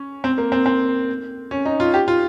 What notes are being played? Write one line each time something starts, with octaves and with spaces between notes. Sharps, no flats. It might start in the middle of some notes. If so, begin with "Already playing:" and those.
Already playing: C#4
C4
A#3
C4
C4
C#4
D#4
F4
G4
F4